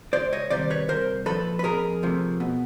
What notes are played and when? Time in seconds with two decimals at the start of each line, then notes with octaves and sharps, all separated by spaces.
0.13 C#2 C5 D5
0.33 C#5 D#5
0.50 C3 D#3 G3 C5 D5
0.70 B4 C#5
0.88 C2 A#4 C5
1.26 A#2 F3 A4 B4
1.59 B4
1.64 F2 G#4 A#4
2.03 C3 F3 A3
2.40 B2